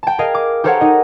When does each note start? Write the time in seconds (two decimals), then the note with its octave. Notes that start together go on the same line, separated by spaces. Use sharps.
0.03 G5 A5
0.19 G#4 A#4 D#5 F5
0.35 D6
0.64 G4 A4 A#4 C5 C#5 F#5
0.81 D#4 D#5